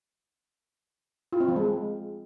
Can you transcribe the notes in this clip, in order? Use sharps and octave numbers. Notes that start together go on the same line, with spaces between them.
F4
C4
F3
G#3